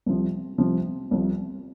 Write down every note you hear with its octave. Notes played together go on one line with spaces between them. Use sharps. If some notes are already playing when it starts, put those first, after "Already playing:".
C2 C3 F3
C2 C3 F3
C2 C3 F3